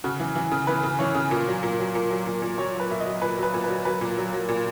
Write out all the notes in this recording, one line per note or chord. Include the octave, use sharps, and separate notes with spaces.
C#3 F#4
E3
E3
C#3
E3 B4
C#3
E3 C#5
C#3
A#2
F#3
A#2
F#3
A#2
F#3
A#2
A#2
F#3 C#5
F#3 B4
A#2 E5
D#5
F#3
A#2 B4
F#3
B4
A#2
F#3 B4
F#3 B4
A#2
F#3
F#3
A#2